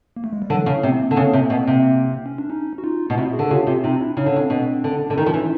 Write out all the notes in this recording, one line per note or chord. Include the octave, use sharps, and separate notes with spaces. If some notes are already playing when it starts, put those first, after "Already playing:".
A#3
A3
G#3
G3
D3 E3 F#3
C#3
C3 A3 B3
A#3 C4
D3
C#3
C3
B2
C3
C#4
D4
C#4 D#4
F#4
D#4 F4
B2
C3 E4 F#4
F#4 G#4
D3
C#3 F4 G4
C3 F4 G4
C3 D#4 F4
D4 E4
C#3 C#4 D#4
D3
C#3 C4 D4
B2
D3
D3 D4
D#3 C#4 D#4
F3
E3